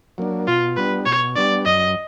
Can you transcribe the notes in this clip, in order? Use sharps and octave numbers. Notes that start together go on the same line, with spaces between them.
F#3 A#3 D4
B2 F4
G3 B3 D4 B4
B2 C#5
G3 B3 D4 D5
F#2 D#5